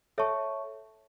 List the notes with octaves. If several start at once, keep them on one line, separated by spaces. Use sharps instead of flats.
A4 C#5 E5 A5 C#6